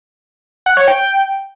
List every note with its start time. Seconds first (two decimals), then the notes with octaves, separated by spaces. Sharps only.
0.66 F#5
0.77 C#5
0.88 G5